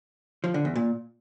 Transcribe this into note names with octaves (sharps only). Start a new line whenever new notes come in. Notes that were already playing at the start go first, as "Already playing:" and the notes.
F3
D3
E2
A#2